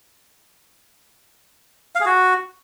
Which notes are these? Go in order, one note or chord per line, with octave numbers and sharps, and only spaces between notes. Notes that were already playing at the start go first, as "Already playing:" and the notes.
F5
G#4
F#4